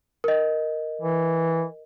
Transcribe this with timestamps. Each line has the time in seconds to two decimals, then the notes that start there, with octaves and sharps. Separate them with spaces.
0.24 A#4 D#5
1.02 E3